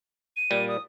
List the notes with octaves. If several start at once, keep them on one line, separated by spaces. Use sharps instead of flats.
D#7
A#2 G3
D#6